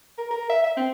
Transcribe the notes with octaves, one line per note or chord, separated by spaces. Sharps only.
A#4
A#4
E5
E5
C4